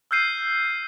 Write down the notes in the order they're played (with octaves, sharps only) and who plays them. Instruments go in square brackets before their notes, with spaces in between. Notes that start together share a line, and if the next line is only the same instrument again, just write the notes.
[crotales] E6 F6 G6 C7 D#7